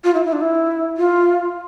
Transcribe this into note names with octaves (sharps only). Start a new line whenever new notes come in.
F4
E4
E4
D4
E4
F4